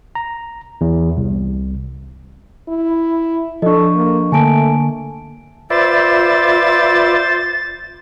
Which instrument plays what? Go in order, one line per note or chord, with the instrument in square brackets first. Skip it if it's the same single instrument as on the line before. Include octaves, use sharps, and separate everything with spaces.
[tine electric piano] A#5
E2
C2
[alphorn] E4
[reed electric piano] F3 D4 [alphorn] A4 [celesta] D#5 C#6
[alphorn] A#3
[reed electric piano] D3 A#3 [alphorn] A3 [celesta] G#5 A5 D7
[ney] F4 [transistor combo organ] B4 D5 E5 [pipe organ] C5 [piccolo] A6